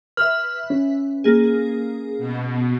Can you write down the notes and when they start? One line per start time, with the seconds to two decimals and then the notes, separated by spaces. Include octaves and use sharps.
0.17 B4 E5 F6
0.70 C#4
1.24 A#3 G#4
2.18 B2